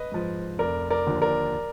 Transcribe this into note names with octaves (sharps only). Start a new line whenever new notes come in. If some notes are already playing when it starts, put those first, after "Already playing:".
Already playing: B4 D#5
G#2 F3
F1 A#4 D5
A#4 D5
D#2 D3 F3
A#4 D5